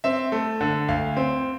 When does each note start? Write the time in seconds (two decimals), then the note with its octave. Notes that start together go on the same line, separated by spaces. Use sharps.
0.04 C4 E5
0.32 A3
0.61 D3
0.88 D2 F5
1.17 C4